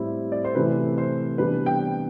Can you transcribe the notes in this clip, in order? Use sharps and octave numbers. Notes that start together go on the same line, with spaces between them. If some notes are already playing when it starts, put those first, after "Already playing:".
Already playing: A2 G3 C4 E4
D5
C5
C3 E3 A3 E4 B4
C5
C3 E3 G3 B3 D4 B4
G5